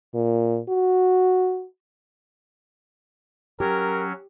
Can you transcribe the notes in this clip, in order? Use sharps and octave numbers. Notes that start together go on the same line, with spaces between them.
A#2
F#4
F#3 C#4 G4 A#4